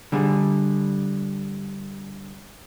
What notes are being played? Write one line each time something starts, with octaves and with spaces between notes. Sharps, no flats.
D3 G3 G#4